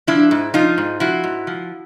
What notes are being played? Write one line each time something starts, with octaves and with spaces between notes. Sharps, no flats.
F3 D4 E4
G#2
F3 D#4 F4
G#2
F3 E4 F#4
G#2
F3